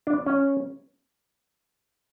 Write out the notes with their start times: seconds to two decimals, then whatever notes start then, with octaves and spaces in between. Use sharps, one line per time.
0.07 D4
0.26 C#4